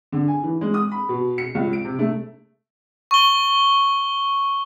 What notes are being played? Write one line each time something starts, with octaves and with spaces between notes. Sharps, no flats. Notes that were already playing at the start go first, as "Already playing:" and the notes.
D3
G#5
E3
G#3
D#6
B5
B2
C#7
C#2
D7
C3
A3
C#6 G7